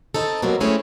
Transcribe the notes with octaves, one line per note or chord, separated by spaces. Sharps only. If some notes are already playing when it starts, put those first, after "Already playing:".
C4 D#4 A4
B2 D#3 F#3 A#3 C4
A3 C4 C#4 E4 G#4